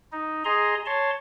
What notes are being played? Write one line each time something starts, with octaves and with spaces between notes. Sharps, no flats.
D#4
G#4 D#5 A#5 C6
C#5 A5 C6